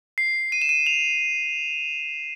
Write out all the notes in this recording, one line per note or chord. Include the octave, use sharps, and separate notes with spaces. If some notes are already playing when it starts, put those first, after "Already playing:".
C7
D#7
E7
D#7
F7